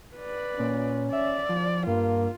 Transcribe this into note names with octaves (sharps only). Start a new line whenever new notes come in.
B4 D5
A#2 C#4
D5 E5
F3
G2 A#3 F4